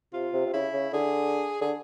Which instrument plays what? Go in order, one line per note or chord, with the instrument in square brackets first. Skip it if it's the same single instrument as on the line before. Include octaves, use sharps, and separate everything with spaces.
[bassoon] C3 [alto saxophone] F4
[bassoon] C3
C3
[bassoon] C#3 [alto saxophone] E4
[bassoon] C#3
[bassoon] D3 [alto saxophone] G#4
[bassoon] D3 [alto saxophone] G#4